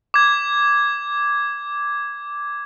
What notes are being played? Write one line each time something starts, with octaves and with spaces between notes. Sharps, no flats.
D6 G#6